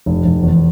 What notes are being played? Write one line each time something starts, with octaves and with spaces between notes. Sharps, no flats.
F1
F1
E2